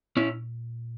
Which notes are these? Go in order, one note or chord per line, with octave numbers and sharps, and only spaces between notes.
A#2 C#4 E4